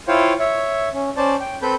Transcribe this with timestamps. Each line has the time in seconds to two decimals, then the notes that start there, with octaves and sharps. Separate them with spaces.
0.08 E4 F4 C5 C#5 F5 G5
0.40 C#5 E5
0.93 C#4
1.17 C#4 C5 D5 A5
1.40 G5
1.62 C4 A4 B4 B5 G6